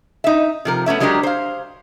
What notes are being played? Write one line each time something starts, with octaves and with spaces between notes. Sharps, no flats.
D#4 E5
C3 F3 A#4
A3 B3 C#4 E5
F#3 G#3 D4 G4 A#4
C5 F5